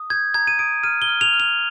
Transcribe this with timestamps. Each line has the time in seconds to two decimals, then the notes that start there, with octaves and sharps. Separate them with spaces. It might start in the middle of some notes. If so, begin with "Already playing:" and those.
Already playing: D#6
0.10 G6 G#6
0.34 A#5 G#6
0.47 D#7
0.59 D#6 D7
0.83 F6 D#7
1.02 G7
1.08 F6
1.21 F7
1.33 F6
1.40 F7